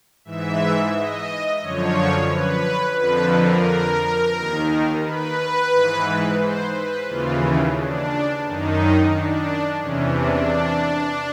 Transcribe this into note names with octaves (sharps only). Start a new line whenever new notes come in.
G#2 E3 E5
D#5
F#2 D3 F3 C#5
B4
F2 D3 F3 B4
A#4
D#2 D#3
B4
G#2 E3
C5
B4
D#2 C#3 E3 F4
D4
F#2 D#3 D#4
D4
E2 C3 E3 C#4
D4